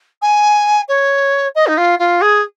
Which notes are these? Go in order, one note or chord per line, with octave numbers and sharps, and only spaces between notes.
G#5
C#5
D#5
D#4
F4
F4
G#4